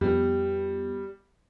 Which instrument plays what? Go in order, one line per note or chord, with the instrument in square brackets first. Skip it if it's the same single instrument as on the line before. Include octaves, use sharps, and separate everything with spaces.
[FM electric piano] F2 B3 [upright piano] G3